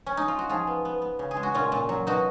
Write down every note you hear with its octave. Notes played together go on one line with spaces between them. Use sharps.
C#4
D#4
F4
F#4
F3 F4 G#4
B3
B3
B3
C#3
G#4
G#3
F#4
A#2 C#4 F4
A#2
F#3
B2 D#4 F#4